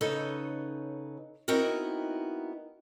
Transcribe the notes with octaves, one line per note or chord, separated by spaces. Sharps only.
C#3 D#4 A4 B4 C#5
B3 C4 D#4 E4 F#4 A#4